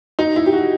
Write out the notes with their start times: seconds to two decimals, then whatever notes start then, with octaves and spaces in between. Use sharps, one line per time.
0.19 D#4
0.36 E4
0.46 G4
0.53 F#4